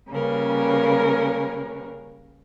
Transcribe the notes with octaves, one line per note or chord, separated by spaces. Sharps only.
C#3 G3 A#3 C#4 A#4 B4